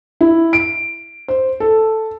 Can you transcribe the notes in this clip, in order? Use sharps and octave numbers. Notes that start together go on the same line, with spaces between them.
E4
D7
C5
A4